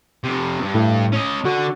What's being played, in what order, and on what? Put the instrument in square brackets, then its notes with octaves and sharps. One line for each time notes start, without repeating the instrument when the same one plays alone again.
[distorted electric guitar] F2 C3
G2
[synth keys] A2
[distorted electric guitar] C#4 D#5
[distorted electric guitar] D3 [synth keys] F#4